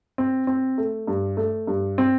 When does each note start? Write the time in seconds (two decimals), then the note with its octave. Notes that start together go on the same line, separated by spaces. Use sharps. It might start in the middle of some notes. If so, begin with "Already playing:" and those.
0.18 C4
0.47 C4
0.78 A3
1.07 G2
1.37 A3
1.67 G2
1.98 C4